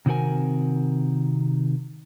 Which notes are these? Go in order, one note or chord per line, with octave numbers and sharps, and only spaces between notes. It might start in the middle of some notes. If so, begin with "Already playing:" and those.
C3 D#3 C4 F#4 A#4 G#5